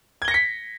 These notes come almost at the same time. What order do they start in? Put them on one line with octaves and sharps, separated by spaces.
G#6 G7 A#6 C#7 B6